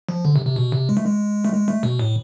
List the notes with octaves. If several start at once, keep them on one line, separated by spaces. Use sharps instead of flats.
F3
D3
C3
C3
B2
C3
G#3
A3
G#3
A3
G#3
A3
B2
A2